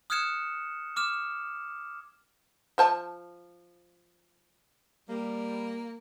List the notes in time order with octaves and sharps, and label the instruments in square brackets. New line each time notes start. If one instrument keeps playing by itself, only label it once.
[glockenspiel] D#6 F6 F#6 G#6 C#7 E7
D6 F6 E7
[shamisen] F3 C5 A5
[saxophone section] G3 [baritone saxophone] A#3